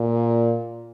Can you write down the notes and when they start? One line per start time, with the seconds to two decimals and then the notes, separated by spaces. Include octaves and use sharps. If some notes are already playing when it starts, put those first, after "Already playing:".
Already playing: A#2